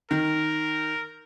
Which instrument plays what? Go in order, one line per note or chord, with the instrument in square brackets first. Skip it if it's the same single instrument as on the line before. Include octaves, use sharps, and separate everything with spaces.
[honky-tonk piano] D#3 [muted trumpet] A#4